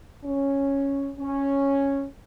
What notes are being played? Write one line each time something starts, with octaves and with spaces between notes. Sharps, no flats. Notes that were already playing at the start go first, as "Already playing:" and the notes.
C#4
C#4